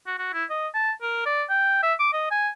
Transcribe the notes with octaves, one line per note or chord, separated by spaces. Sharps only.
F#4
F#4
E4
D#5
A5
A#4
D5
G5
E5
D6
D#5
G#5